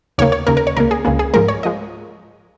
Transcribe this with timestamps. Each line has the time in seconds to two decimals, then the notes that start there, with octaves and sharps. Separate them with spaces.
0.18 D#2 C#3 A#3 C#5
0.32 C#5
0.47 D#2 C#3 A#3 A#4
0.57 A#4
0.67 C#5
0.77 C#2 C#3 A#3 A#4
0.91 G#4
1.05 C#2 C#3 A#3 G#4
1.19 G#4
1.34 G#2 F3 G#3 A#4
1.48 C#5
1.63 F3 G#3 D#5